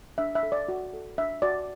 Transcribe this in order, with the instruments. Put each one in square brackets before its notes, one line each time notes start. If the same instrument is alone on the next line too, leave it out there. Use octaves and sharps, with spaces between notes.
[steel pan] D4 E5
E5
A4
D5
F#4
A4
D4 E5
F#4 D5